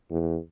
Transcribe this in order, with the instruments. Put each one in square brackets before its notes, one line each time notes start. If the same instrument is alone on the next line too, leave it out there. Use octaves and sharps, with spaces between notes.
[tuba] E2